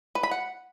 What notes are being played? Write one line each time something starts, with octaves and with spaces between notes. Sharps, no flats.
B4
B5
F#5